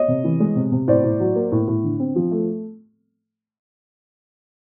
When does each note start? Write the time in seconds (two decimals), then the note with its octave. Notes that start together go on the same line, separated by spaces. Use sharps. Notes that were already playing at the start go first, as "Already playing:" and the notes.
Already playing: C#5 D#5
0.08 C3
0.24 E3
0.40 G#3
0.56 C3
0.72 C3
0.88 A2 C5 D5
1.04 A2
1.20 F#3
1.35 A#3
1.52 A2
1.68 A2
1.84 D3
2.00 C4
2.16 F3
2.31 A3